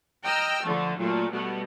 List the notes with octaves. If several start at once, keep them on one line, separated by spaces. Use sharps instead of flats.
D#5 G5 A#5 E6 F6
D3 F3 A3
A#2 F#3 A3
B2 G3 A3 B3